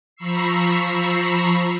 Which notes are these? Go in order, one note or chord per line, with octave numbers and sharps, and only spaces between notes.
F3 A#5 B5 C#6 E6 C7